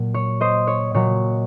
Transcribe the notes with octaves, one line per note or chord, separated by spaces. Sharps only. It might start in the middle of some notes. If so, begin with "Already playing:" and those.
Already playing: A#2 F#3
C#5
C5 D#5
C#5
A#2 F#3 C#5